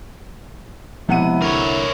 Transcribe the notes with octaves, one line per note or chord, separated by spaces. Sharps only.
C3 F3 G#3 B3 E4 F#5 D#7
C2 D3 A#4 C#5